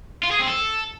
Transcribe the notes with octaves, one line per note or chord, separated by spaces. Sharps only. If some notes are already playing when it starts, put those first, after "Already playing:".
F4
G#4
C4
A4